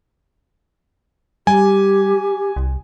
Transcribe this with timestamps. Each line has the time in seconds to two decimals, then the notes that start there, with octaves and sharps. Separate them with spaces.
1.47 G3 G4 G#5
2.56 C2